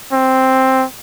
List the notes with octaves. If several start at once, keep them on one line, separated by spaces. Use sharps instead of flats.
C4